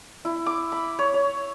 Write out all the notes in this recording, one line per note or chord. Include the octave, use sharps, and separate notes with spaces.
E4
D6
B5
C#5
C#5